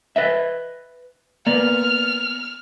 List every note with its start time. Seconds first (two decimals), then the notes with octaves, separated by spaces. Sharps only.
0.16 B4 D#5 E5
1.46 A#3 B3 D5 F6